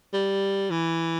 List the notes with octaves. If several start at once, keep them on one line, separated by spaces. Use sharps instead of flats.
G3
E3